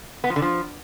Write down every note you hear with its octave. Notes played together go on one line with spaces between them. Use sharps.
B3
F3
D3
F3